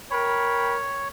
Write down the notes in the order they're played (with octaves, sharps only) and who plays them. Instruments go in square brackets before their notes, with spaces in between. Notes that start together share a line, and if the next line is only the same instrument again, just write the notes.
[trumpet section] A#4 G5 B5 [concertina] C#5